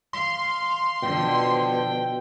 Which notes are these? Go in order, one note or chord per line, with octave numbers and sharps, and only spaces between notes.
F5 C6
B2 D3 F3 G5